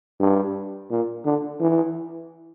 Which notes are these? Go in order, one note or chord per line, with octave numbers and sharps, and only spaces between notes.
G2
A#2
D3
E3